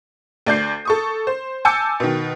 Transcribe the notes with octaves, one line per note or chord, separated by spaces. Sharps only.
D2 D5 G6 C7
A4 C#6 D#6
C5
G#5 A5 D6 E6 G6 C#7
B2 D#3